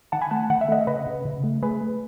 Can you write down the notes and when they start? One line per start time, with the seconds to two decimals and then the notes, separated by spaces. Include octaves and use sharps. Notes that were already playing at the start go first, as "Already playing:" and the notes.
0.12 D#3 F#5 A5
0.21 G#5 B5
0.31 A3 F#5 A5
0.50 D#3 F#5
0.61 E5
0.68 A3 D#5 F#5
0.87 C#3 B4 D#5
1.06 C#3
1.25 C#3
1.44 A3
1.62 A3 G#4 B4
1.81 A3